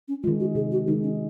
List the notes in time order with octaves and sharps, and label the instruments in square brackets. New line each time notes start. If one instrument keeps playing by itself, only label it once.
[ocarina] C#4
[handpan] D#3 G#3 [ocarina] F4
[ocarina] F#4
[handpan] C3 [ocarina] G#4
[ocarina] F#4
[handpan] D#3 G#3 [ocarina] D#4
[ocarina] C#4